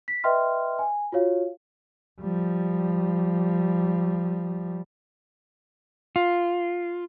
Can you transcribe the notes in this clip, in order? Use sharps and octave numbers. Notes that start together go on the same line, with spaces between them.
B6
B4 D#5 E5 G5 C6 F6
G#5
F4 F#4 C#5 F5
F3 G3
F4